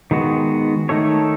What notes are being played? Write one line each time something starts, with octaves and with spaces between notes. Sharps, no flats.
D#3 G#3 B3 F#4
D#3 A3 D#4 A4 C#5